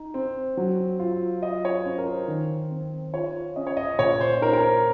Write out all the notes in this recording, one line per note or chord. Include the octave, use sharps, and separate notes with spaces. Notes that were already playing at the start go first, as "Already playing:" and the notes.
Already playing: D#4
C4
F#3
F4
F4 D#5
C#5
C#4 C5
A#4
C5
D#3
C4
F4 C#5
C#4 D#5
C#5
D#5
A#2 C#5
C5
D#4 A#4
A#4
C5